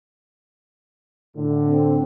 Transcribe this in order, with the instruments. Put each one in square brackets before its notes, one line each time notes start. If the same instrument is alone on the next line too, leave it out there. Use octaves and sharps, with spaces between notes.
[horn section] A2 D3
[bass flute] C4